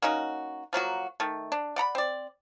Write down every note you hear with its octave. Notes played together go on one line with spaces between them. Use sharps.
A#3 C#4 D#4 F#4
F3 F#3 A#3 F#4
D#3 A3
D4
D5 F#5 A#5 B5
C4 D5